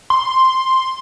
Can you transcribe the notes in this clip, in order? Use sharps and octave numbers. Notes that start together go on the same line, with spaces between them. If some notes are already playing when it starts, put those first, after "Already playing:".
C6